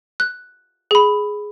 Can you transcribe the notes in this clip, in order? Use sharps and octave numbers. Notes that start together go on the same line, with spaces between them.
F#6
G#4 B5